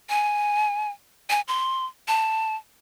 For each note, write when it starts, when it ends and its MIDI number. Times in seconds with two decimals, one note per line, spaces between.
0.09 0.91 80
1.30 1.41 80
1.48 1.86 84
2.08 2.56 81